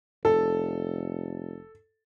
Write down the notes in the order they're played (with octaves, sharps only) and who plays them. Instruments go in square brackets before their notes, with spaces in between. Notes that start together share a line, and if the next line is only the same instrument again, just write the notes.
[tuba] F1 [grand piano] A4